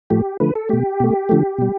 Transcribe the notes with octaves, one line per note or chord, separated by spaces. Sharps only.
A2 F3 A3 G4
D3 F3 A3 B4
A4
B2 A3 G4
B2 A3
D3 F3 A3
B2 G3